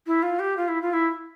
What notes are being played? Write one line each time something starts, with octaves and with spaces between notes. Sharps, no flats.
E4
F4
G4
F4
E4
F4
E4